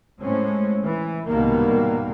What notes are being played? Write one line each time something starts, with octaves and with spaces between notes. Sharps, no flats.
A2 G#3 C4 C#4
E3
C2 G#2 B2 D#3 G3 A#3